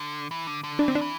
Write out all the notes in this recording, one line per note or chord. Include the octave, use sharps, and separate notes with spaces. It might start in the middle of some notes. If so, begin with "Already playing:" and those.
Already playing: D3
E3
D3
D3
E3 D4
D3 C4
D4
E3